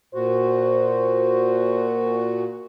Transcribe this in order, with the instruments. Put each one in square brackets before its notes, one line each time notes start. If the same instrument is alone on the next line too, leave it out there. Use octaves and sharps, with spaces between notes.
[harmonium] A#2 F#4 [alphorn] C5